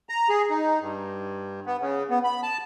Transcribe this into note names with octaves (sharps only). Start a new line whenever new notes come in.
A#5
G#4
D#4
G2
B3
C#3
B3
B5
A5